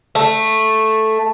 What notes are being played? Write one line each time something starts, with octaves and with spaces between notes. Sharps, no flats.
A3